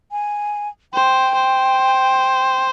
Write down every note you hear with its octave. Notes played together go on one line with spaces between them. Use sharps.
G#5
C5 G5
C5